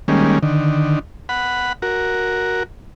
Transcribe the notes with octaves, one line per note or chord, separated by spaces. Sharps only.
D#3 G3 G#3 A#3 C#4
D3 D#3
F#5 B5
F#4 A#4